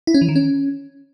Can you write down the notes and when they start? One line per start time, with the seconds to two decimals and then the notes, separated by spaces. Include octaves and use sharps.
0.07 E4
0.14 C#4
0.21 E3
0.29 D#3
0.36 C#4